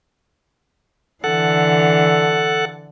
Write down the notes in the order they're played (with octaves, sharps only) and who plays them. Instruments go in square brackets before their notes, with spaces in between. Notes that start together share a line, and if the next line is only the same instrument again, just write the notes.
[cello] D3 E3 [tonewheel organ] A4 F#5